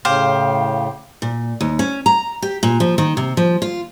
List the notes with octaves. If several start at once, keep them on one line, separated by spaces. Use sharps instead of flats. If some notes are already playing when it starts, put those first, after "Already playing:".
A2 C#3 G4 C5 F5
A#2
D#2
C#4
A#5
G4
A#2
F3
D#3
C3
F3
F4